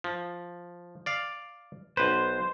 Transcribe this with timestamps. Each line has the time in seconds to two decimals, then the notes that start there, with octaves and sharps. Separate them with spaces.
0.04 F3
1.06 D5 F5
1.97 B1 B4 C5